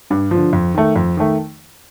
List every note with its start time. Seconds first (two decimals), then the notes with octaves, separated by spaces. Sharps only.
0.10 G2
0.31 D3 F3
0.53 F2
0.74 D#3 A3
0.96 F2
1.17 D#3 A3